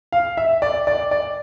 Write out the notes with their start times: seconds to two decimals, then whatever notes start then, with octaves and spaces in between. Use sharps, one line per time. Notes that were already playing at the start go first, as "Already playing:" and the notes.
0.12 F5
0.37 E5
0.62 D5
0.87 D5
1.11 D5